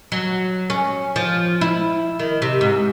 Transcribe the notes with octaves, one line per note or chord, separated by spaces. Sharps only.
F#3
C#4
F3
E4
D#3
C3
G#2